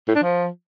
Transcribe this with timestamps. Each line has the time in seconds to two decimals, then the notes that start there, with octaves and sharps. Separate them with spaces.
0.08 A2
0.15 D4
0.23 F3